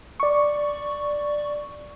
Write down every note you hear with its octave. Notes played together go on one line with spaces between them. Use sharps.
D5 C#6